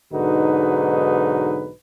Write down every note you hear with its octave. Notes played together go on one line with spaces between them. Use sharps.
B1 G#2 D3 D#4 F#4 B4